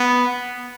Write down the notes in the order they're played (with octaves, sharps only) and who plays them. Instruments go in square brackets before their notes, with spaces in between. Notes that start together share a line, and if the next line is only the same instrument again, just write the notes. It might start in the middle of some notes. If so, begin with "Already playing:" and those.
Already playing: [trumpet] B3